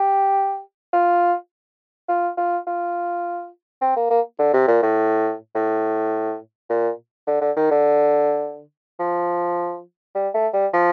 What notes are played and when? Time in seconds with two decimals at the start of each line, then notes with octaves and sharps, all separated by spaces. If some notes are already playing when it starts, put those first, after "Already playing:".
Already playing: G4
0.93 F4
2.09 F4
2.37 F4
2.67 F4
3.81 C4
3.96 A#3
4.10 A#3
4.39 D3
4.53 C3
4.67 A#2
4.82 A2
5.55 A2
6.69 A#2
7.27 D3
7.41 D3
7.56 D#3
7.71 D3
8.99 F3
10.15 G3
10.34 A3
10.53 G3
10.73 F3